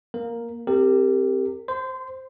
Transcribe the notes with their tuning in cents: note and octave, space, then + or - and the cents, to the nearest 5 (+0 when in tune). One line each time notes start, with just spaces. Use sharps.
A#3 +5 A#4 +0
C4 +0 G4 +5 A#4 -30
C5 +0 C6 -30